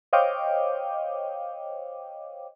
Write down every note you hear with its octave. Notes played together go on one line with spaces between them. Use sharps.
C5 C#5 D#5 F5 G5 D6